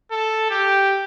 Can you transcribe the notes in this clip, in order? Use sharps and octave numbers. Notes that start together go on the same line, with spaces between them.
A4
G4